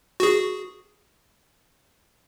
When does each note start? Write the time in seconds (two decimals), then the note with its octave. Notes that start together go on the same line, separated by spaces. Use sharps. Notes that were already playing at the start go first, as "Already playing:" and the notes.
0.20 F#4 G#4